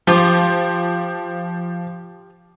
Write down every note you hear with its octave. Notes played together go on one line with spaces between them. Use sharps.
F3 F4 G4